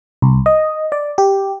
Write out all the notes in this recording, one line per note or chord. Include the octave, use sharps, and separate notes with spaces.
C2
D#5
D5
G4